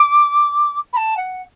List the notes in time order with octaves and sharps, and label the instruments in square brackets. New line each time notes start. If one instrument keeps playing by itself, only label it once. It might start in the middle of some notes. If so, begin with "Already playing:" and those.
Already playing: [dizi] D6
B5
A5
F#5